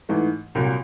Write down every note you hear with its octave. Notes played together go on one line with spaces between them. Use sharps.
G#2 E3 A3
C2 A#2 F#3